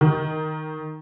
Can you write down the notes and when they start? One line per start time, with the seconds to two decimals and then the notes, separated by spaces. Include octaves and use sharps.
0.01 D#3